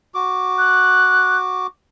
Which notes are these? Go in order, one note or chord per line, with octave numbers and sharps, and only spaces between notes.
F#4 D6
F#6